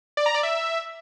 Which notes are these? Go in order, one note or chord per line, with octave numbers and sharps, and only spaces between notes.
D5
A#5
D5
E5